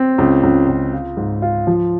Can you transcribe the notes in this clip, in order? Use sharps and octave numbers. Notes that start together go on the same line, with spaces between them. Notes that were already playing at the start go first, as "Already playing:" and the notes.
Already playing: C4
C#2
C#2
C#2
F4
G#2
F4
F3